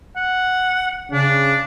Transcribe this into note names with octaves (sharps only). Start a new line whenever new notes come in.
F#5
C#3 D4